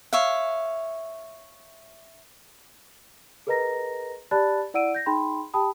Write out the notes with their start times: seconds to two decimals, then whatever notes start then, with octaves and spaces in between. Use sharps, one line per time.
0.13 C#5 E5 F5
3.47 G#4 A#4 B4 D#5 A#5 A#6
4.31 G4 D5 A5 B5 F#6 A6
4.74 E4 D5 F#5 E6 D7 D#7
4.95 G6 A#6
5.06 D#4 G#4 G5 B5 C6
5.54 G4 G5 A5 B5 D#6